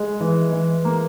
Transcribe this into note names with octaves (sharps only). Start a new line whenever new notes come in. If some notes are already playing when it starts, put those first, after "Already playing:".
Already playing: G#3
E3
E3
A#3